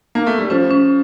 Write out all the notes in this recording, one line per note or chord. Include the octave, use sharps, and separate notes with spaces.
A#3
A3
G3
F3 C#4
C#4